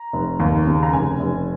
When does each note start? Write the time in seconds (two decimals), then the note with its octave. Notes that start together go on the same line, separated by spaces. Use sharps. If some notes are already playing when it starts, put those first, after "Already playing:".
Already playing: A#5
0.13 F1
0.40 D#2
0.67 C#3
0.83 A#5
0.93 F1 G#5
1.20 F1